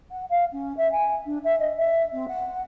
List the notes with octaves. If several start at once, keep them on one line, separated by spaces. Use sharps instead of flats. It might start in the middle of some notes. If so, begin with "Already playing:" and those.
F#5
F5
C#4
E5
G#5
D4
E5
D#5
E5
C4
F#5